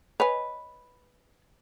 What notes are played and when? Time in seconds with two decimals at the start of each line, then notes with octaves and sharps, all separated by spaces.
0.20 B4 C#5 D#5 G#5